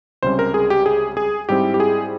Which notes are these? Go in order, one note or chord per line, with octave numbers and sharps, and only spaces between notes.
C#2 C3 G3 C#4 C5
A#4
G#4
G4
G#4
G#4
G#2 G3 C4 E4 G4
G4
G#4